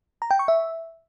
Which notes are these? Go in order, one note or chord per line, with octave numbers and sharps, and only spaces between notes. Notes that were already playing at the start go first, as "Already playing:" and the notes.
A#5
G5
C#6
E5